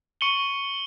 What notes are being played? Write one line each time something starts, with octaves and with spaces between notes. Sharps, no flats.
C#6 C#7 D#7 F#7 G7